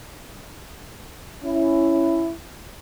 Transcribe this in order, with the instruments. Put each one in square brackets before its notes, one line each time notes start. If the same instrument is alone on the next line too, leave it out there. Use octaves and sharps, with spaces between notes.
[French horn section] C#4 E4